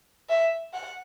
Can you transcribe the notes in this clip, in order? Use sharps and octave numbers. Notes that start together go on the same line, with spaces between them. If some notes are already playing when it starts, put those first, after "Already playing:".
E5
F#5